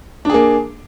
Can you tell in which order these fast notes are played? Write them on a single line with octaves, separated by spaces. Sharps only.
D4 G#4 A#3